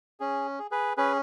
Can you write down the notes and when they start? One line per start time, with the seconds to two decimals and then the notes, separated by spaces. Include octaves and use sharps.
0.20 C#4 G#4
0.59 G#4
0.71 G#4 B4
0.97 C#4 G#4 B4